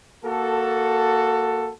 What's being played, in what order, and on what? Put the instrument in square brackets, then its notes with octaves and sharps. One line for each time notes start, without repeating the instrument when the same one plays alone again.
[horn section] A#3 F#4 A4